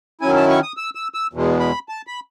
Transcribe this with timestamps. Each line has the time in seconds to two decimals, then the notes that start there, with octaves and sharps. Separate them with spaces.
0.21 D#3 F#3 C#4 E4 G#5
0.36 A5
0.49 C#6
0.63 D#6
0.77 E6
0.95 E6
1.14 E6
1.33 E2 B2 G#3
1.60 B5
1.89 A5
2.07 B5